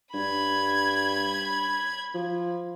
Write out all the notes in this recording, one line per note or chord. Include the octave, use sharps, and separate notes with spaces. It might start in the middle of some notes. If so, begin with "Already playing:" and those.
G2 B5 G#6
F3